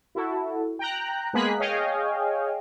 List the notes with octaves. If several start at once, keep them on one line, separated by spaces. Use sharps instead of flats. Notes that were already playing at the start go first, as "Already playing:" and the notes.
E4 F#4 A4
G5 A#5 F#6
G#3 A#3 B3 G#4 F#6 B6
G#4 C#5 D#5 F5 G5 G#5